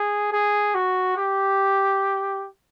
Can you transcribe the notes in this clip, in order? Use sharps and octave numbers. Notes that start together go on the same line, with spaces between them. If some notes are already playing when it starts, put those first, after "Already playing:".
Already playing: G#4
G#4
F#4
G4